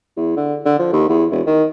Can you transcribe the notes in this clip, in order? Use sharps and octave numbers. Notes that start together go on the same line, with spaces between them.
E2
D3
D3
F3
D#2
E2
E1
D#3